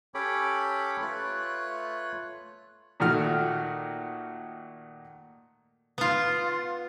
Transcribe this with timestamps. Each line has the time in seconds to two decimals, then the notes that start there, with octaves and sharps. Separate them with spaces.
0.14 C#4 G4 A4 C#5 B5 D6
1.02 A3 F4 B4 C#5 F#6
3.00 A#2 D#3 A3 F#4 F6
5.98 B3 F4